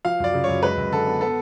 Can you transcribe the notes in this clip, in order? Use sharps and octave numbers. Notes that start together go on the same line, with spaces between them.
F3 F5
F#2 D5
C#3
F#2 C#5
G#3 B4
F#2
D3 A4
B3
B3 A4